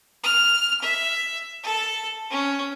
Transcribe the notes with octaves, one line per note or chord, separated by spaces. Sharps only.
F6
E5
A4
C#4